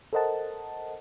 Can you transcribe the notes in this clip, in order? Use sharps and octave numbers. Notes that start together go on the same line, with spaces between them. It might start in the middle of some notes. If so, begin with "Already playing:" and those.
A4 A#4 C5 D#5 F#5 A5